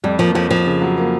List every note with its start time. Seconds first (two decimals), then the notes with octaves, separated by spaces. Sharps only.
0.04 F2 G3
0.19 F3 A#3
0.34 F2 F3
0.50 F2 F3
0.66 C#3
0.81 F#3
0.97 A#3